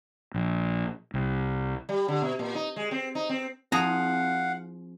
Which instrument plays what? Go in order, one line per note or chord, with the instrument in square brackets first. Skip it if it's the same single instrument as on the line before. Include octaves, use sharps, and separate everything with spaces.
[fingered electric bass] A#1
C2
[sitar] G3
D3
B2
A#2
D#4
G#3
C4
D#4
C4
[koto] F3 G#4 A#5 [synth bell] C4 [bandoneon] F5 F#5